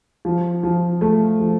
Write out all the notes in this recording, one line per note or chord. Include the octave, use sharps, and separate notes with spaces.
F3
F3
A3
F3